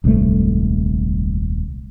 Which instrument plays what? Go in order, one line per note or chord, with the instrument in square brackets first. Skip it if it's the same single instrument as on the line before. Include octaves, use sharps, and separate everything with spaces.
[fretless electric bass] D#1 C2 G#2 A3